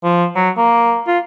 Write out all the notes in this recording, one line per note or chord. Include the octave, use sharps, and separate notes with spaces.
F3
F#3
A#3
F4